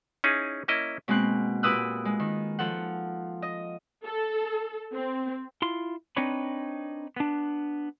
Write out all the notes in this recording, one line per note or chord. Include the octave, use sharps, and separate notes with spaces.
C#4 D#4 E4 G#4
A#3 C#4 E4 D#5
B2 G#3 A#3 C4 F#6
A#2 G4 B4 D#6 E6 F#6
G#3
D#3
F3 A4 F#5
D#5
A4
C4
E4 F4 C6
C4 D4 D#4 B4 C#5 B5
B3 D4